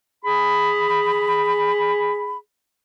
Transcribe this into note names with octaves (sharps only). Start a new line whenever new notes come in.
G#4 B5